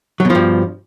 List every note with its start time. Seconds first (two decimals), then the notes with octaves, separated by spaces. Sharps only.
0.20 F#3
0.25 B2
0.30 F3
0.35 G2